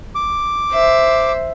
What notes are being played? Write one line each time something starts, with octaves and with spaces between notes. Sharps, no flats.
D6
C5 E5